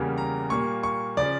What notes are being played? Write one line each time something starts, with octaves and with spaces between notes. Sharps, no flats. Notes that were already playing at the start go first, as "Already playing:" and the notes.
Already playing: E2 C#3 G3 A#3
A#5
A#2 G3 A#3 C#6
C#6
C#3 F3 D5